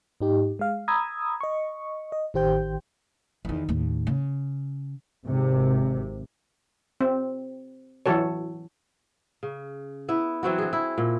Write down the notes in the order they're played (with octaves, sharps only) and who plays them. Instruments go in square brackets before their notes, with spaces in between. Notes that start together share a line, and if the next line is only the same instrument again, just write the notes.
[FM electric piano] G#2 D#4 G4
G#3 F5
A#5 B5 D#6 E6 G#6
D#5 C#6
D#5
A1 D#3 G4 C5 G5 G6
[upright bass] E2 D#3
D#2 A2
C#3
[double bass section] G#1 C3
[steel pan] C4
E3 F#3 F#4 A4 C#5
[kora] C#3
B3 E4
E3 F#3 C4 F#4
D3 G#4
E4
A#2